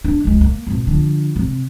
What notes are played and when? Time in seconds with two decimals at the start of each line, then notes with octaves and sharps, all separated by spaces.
0.05 D4 E4
0.25 C#2 G#3
0.41 A#3
0.67 F2 B2
0.87 D3 F3
1.36 C3